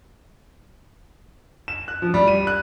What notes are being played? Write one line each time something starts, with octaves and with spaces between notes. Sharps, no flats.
E7
F#6
F3
G3
D#7
F#6